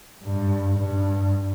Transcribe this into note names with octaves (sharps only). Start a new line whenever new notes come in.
G2
G2